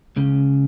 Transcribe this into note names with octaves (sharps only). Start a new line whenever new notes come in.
C#2 C#3